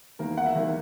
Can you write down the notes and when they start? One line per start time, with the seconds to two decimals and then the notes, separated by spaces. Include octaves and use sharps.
0.19 E2 D#3 A#3 A#4
0.37 F#5
0.46 E5
0.55 E2 D#3 A#3